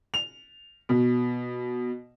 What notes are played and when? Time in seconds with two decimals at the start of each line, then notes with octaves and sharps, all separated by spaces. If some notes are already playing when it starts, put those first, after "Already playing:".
0.14 F7
0.89 B2